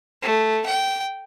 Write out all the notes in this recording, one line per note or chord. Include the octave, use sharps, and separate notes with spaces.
A3
G5